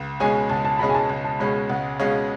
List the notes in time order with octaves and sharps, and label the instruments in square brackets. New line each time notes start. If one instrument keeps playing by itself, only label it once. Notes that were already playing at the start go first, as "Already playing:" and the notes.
Already playing: [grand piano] C#2
[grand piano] B2 G#3 C#4 G#4 [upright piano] G#5
[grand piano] C#2 [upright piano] A5
[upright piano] A5
[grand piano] B2 G#3 C#4 G#4 [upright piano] B5
[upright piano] G#5
A5
[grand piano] C#2
[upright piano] A5
[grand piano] B2 G#3 C#4 G#4 [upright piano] B5
[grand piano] C#2 [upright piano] F#5
[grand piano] B2 G#3 C#4 G#4 [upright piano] F5